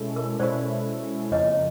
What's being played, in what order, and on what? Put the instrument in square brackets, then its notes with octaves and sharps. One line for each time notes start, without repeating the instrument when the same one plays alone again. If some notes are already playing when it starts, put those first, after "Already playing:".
Already playing: [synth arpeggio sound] B2 G#3 C#4 E4 A4
[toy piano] A#4
[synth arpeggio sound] B2 G#3 C#4 E4 A4 [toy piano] C5 D5
[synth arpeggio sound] F2 C#3 F3 A#3 [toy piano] C#5 D#5